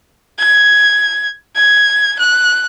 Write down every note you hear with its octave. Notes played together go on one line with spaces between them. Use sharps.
G#6
G#6
F#6